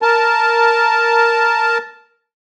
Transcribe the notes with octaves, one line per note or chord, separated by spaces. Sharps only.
A#4 A5